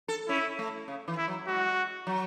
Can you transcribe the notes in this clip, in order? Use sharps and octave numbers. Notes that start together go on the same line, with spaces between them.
A4
C#4 E4
A3
C#3
E3
E4
F#3
G#3 F#4
F#3